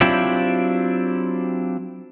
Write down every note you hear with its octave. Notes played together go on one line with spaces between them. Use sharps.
F#3 C4 D4 E4 F4 G4